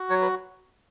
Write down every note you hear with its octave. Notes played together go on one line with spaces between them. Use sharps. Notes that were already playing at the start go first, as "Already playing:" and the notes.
Already playing: F#4
F#3 C#5
B4